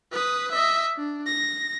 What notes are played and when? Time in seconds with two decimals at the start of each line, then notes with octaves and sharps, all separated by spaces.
0.12 B4 D#6
0.51 D#5 E5
0.96 D4
1.26 A#6